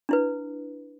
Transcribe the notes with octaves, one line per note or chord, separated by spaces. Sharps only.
D4 E4 B4